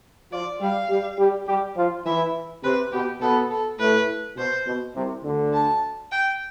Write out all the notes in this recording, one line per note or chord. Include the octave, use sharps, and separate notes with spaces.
F3 F4 D5
G3 G4 F5
G3 G4
G3 G4
G3 G4
F3 F4
E3 E4 E5
C3 C4 B4
B2 B3 G4
B2 B3 A4
A4
A2 A3 B4
B2 C5
B2
C2 C3
D2 D3
A5
G5